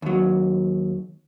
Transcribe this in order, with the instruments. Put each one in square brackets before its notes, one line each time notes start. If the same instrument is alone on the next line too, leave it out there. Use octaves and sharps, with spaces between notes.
[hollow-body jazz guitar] D#2 F#3